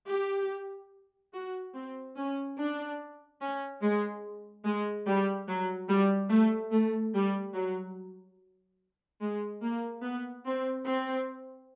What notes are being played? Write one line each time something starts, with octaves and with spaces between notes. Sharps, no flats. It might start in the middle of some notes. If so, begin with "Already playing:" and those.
G4
F#4
C4
C#4
D4
C#4
G#3
G#3
G3
F#3
G3
A3
A3
G3
F#3
G#3
A#3
B3
C4
C4